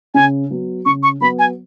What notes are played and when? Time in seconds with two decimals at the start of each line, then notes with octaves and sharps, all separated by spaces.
0.14 C#3 G#5
0.50 F#3 B3
0.86 C#3 C#6
1.03 C#6
1.20 F#3 B3 B5
1.39 G#5